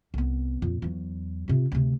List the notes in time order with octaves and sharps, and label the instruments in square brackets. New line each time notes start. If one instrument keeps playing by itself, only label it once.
[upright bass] C2 B3
F2 A#2
E2 F#3
C3 F4
D2 C3